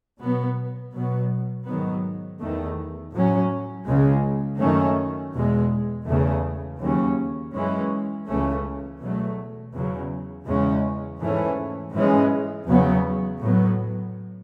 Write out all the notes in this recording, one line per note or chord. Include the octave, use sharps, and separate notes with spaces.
B2 F#3 B3
B2 F#3 B3
G#2 D#3 F#3 B3
E2 D#3 A3
A2 F#3 C#4
C#2 C#3 G#3
F#2 D#3 A3 C#4
E2 B2 G#3
E2 C#3 E3 A3
D#2 C#3 F#3 C#4
F#2 E3 G#3 C#4
C#2 C#3 E3 A3 C#4
E2 B2 F#3 A3
E2 C#3 F#3
E2 C#3 G#3 C#4
G#2 E3 A3 C#4
G#2 E3 G#3 C#4
E2 C#3 F#3 B3
A2 F#3 B3